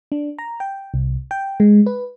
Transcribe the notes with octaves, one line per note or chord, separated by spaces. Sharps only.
D4
A#5
G5
C2
G5
G#3
B4